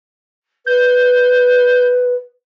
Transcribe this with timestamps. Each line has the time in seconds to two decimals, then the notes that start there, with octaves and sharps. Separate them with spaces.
0.66 B4 G6